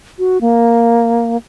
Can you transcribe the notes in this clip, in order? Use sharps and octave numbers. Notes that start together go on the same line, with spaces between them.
F#4
A#3